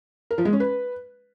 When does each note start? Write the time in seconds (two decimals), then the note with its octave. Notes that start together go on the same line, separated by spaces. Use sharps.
0.31 A#4
0.38 F3
0.45 G#3
0.53 C#4
0.60 B4